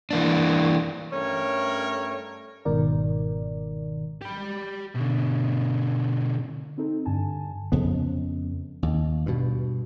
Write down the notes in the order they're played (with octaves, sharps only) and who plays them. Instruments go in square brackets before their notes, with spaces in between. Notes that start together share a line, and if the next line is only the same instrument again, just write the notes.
[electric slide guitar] E3 A#3 D4
[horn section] G2 A3 C#4 A#4 C#5
[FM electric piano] G1 G#2 B2 D#3 A#4 D5
[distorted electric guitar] G4 B5
B2 D3
[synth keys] C4 D#4 A4
G2 D3 G#5 A5
[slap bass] F2 C#3 B3
D#2
G2 B2